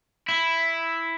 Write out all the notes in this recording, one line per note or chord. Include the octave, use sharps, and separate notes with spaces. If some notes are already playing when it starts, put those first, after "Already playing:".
E4